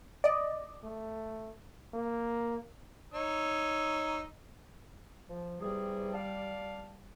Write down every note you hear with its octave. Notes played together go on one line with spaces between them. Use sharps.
D5 D#5
A3
A#3
D#4 C#5 E6
F3
E2 C3 G3 G#4
D5 F5 A5